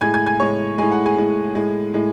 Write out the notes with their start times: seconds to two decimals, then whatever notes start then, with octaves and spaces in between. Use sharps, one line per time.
0.01 A2 G#3 G#5 G#6
0.14 G#5 G#6
0.26 G#5 G#6
0.40 A2 G#3 C#5 C#6
0.78 A2 G#3 G#5
0.92 F#5
1.06 G#4 G#5
1.17 A2 G#3
1.55 A2 G#3
1.94 A2 G#3